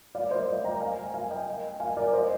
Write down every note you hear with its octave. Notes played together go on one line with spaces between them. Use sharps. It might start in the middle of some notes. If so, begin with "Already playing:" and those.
D5 F5
C5 D#5
C5 D#5
G5 A#5
F5 G#5
F5 G#5
D#5 G5
F5 G#5
A#4 D5
C5 D#5